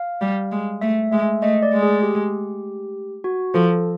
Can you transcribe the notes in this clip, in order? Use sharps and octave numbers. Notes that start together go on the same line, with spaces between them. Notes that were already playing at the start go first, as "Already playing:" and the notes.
Already playing: F5
G3
G#3
A3 E5
G#3 E5
A3 D#5
D5
G#3
G#4
G4
F#4
F3 A4